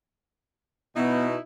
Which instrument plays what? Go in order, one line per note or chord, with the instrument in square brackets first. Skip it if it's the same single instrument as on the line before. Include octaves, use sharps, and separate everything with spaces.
[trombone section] B2 [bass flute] B3 [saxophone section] D#4 E4